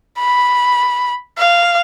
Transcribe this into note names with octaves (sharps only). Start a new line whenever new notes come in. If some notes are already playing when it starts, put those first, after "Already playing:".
B5
F5